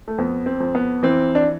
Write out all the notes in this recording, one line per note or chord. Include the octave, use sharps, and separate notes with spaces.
A3
F2 B3
C4
F2
B3
E3 C4
D4